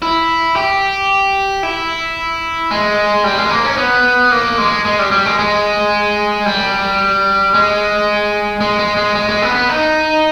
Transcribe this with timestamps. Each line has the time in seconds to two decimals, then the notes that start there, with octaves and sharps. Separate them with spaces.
0.02 E4
0.56 G4
1.63 E4
2.71 G#3
3.24 G3
3.38 G#3
3.50 A#3
3.65 C#4
3.77 B3
4.32 A#3
4.58 G#3
4.85 G#3
4.99 G3
5.11 G3
5.26 G#3
5.39 G#3
6.46 G3
7.54 G#3
8.61 G#3
8.79 G#3
8.97 G#3
9.15 G#3
9.29 G#3
9.42 B3
9.55 B3
9.69 D#4